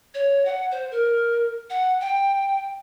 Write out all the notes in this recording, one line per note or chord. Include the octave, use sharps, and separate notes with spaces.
C#5
F#5
C5
A#4
F#5
G5